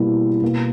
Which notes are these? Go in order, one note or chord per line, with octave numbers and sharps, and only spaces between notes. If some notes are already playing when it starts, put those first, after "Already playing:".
Already playing: B2 G3 A#3 E4
B2 A#3